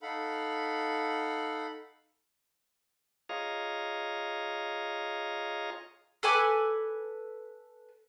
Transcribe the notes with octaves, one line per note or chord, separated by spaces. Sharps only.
D#4 A4 F5 F#5 B5
F4 G#4 C#5 D#5 F5 A#5
A4 B4 G#5 D6